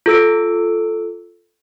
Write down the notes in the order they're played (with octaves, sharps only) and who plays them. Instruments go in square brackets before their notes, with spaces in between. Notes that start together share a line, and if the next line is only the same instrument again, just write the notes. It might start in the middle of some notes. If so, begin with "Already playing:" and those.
[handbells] F4 A4 E6 D7